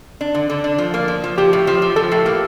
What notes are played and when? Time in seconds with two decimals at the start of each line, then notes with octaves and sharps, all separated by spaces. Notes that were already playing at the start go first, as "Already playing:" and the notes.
0.21 D4
0.35 D3
0.50 D3
0.64 D4
0.78 F3
0.94 A#3
1.08 F3
1.24 F3
1.38 F3 G4
1.53 A2
1.67 F3
1.82 F3
1.96 F3 A4
2.11 A2
2.26 A#3